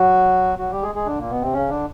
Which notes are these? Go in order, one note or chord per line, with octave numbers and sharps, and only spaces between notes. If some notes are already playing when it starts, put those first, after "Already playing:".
Already playing: F#3 F#4
F#3 F#4
G3 G4
G#3 G#4
G#3 G#4
D3 D4
A#2 A#3
B2 B3
C3 C4
C#3 C#4
D3 D4